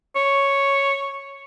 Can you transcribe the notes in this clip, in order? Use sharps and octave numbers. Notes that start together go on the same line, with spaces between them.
C#5